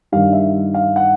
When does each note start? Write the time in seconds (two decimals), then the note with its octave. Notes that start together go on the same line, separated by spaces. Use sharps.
0.12 G2 D#3 G3 F5
0.33 E5
0.74 F5
0.96 F#5